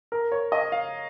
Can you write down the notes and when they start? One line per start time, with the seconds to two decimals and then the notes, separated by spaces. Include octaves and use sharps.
0.12 A#4
0.32 C#5
0.52 D#5
0.72 F5